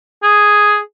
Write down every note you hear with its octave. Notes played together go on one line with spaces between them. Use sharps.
G#4